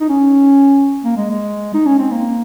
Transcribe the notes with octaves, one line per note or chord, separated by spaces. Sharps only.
D#4
C#4
A#3
G#3
G#3
D#4
C#4
C4
A#3